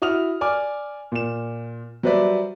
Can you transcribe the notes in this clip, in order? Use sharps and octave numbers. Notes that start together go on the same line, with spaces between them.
E4 F#4 D#6 F6 F7
D5 G#5 D6 F6
A#2 E7
F#3 G3 B4 C5 D5 E5